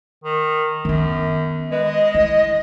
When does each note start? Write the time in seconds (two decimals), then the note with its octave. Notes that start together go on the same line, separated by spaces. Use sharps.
0.24 D#3
0.85 F#2 D#3 B3
1.71 G#3 B4
1.84 D#5
2.14 E4